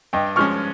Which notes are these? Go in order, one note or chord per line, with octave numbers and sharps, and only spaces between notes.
G2 D#5 G5
F3 G#3 C#4 C#6 F6